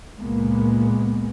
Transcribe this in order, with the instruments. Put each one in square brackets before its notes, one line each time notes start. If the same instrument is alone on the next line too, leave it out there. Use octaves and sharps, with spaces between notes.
[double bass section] C#2 A#2 G#3 A#3 B3